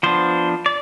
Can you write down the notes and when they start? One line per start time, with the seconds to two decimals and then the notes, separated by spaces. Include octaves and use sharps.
0.03 F3 B3 D4 C5
0.66 D5